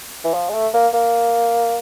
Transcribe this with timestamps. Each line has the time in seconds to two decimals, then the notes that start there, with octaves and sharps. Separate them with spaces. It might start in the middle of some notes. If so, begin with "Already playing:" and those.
0.24 E3
0.34 F3
0.49 G#3
0.54 A3
0.74 A#3
0.94 A#3